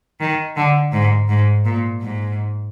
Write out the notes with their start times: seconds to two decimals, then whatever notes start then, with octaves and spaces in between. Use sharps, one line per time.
0.20 D#3
0.56 D3
0.93 G#2
1.29 G#2
1.65 A#2
2.02 G#2